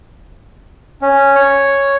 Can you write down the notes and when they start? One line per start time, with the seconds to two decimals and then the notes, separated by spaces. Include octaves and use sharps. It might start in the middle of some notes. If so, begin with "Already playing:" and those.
1.02 C#4
1.35 C#5